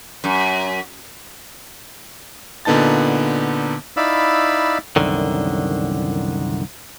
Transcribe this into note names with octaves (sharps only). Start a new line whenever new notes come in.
F#2
A#2 D3 B3 D#4 A5 A6
D#4 E4 D5 F5 B5 E6
C2 F#2 D3 D#3